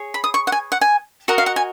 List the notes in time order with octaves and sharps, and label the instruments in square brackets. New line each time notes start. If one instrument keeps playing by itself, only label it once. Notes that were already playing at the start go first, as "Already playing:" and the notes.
Already playing: [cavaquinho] G#4 C#5
B5
D#6
C#6
F#5
G#5
F#5
G#5
F#4 A#4 D#5 F#5
F5
F#5
G#5